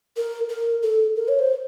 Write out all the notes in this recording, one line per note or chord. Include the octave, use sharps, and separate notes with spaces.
A#4
A#4
A4
A#4
C#5
C5